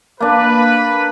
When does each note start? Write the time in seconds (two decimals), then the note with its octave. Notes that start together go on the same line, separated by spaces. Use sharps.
0.20 A#3 D4 B4